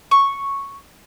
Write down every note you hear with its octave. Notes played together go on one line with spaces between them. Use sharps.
C#6